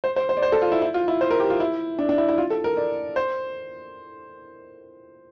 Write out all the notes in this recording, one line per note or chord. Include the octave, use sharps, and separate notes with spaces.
C5
C5
C5
D5
C5
A4
F4
E4
E4
F4
E4
C5
A#4
G4
F4
E4
D4
D4
E4
E4
F4
A4
A#4
D5
C5